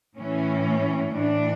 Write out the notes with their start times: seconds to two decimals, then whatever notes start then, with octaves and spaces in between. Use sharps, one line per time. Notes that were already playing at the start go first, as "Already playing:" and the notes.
0.17 A2 E3 C#4
1.15 A2 E3 D4